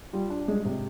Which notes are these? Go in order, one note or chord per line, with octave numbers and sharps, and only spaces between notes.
G3 F4
D4
G3 G#3
C3